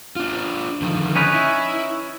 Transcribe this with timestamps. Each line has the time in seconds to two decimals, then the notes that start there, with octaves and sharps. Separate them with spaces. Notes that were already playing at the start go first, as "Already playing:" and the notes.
0.16 D4 F4
0.82 D3 D#3 F3
1.15 C#4 D#4 B4
1.34 E4